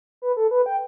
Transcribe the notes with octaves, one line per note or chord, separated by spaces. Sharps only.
B4
A4
B4
G5